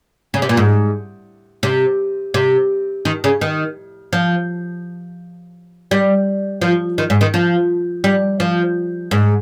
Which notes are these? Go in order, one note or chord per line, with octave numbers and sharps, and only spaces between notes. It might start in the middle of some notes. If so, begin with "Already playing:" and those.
C#3
C3
A#2
G#2
C3
C3
D#3
C#3
D#3
F3
G3
F3
D#3
G#2
D#3
F3
G3
F3
G#2